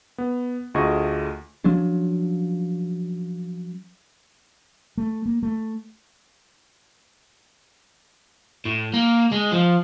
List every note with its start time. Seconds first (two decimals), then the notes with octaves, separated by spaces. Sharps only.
0.18 B3
0.74 D2 A3 F4 G#4 D#5 C#6
1.64 F3 F#3 C#4 D4
4.98 A3
5.26 A#3
5.43 A3
8.66 A2
8.94 A#3
9.31 G#3
9.52 F3